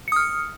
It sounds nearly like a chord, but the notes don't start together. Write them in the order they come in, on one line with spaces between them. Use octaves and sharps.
C#7 D#6 F6